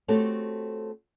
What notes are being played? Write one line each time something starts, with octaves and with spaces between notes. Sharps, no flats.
A3 C4 F#4 G4 A4 C#5